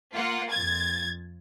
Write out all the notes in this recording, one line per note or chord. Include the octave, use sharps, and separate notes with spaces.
A#3 F4 F#5
F2 G#6 A6